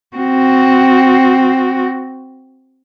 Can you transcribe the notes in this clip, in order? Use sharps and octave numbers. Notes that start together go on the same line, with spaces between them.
C4 F#4